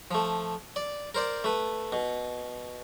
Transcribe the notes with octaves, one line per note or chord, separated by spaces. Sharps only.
F3 A3
D5
A#4 C5 D5
A3 B4
B2